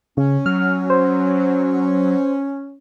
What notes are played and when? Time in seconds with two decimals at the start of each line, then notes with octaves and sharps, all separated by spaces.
0.17 C#3 C#4
0.46 F#3 F6
0.90 C5